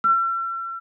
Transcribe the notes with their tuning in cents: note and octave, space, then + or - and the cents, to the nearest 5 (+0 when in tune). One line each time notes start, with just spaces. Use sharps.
E6 +45